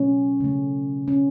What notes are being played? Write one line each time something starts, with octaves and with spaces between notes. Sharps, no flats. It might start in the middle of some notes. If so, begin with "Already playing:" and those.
Already playing: B2 F#3 A3 C#4
C#3 A3
C#4